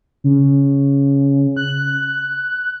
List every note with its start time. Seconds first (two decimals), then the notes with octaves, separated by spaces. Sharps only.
0.24 C#3
1.57 F#6